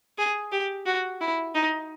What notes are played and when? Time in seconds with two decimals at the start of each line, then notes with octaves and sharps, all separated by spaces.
0.18 G#4
0.52 G4
0.86 F#4
1.21 E4
1.55 D#4